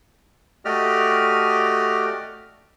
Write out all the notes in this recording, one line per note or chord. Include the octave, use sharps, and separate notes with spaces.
A3 F#4 G4 D5 D#5 F6